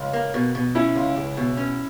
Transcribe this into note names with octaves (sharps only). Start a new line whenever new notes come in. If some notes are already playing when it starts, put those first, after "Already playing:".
Already playing: C#2
A#3
B2
B2
C#4 E4
C#2
C#2
B2
C#4